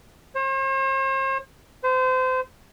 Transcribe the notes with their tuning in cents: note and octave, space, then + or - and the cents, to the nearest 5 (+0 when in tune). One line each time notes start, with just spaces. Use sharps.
C5 +45
C5 -30